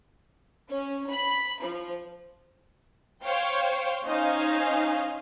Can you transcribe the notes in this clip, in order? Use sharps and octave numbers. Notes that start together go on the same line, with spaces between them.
C#4
B5
F3
C5 C#5 F5 G5
C#4 D#4 C5 D#5 F5 G#5